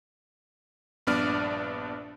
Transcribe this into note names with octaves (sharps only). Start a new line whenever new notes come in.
A#1 G2 B3 D4 D5 F6